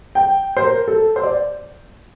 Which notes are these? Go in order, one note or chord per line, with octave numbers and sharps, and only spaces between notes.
G5
C5
A#4
A4
C5
D5